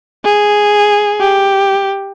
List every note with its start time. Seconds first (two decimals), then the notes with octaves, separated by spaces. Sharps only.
0.25 G#4
1.20 G4